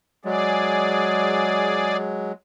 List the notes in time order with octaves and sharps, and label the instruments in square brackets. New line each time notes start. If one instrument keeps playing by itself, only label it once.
[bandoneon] F#3 G#3 [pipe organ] G#4 D5